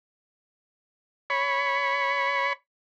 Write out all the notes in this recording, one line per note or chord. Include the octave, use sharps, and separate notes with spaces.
C#5 B5